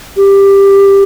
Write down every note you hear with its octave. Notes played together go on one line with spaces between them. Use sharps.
G4